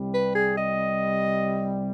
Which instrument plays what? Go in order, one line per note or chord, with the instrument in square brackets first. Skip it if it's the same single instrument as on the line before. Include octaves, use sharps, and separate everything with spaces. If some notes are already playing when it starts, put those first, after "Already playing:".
Already playing: [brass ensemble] C2 C3 G3
[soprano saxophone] B4
G#4
D#5